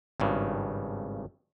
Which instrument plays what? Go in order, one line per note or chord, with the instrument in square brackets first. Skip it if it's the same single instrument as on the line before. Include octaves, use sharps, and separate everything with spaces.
[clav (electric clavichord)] G#1 G2 C#3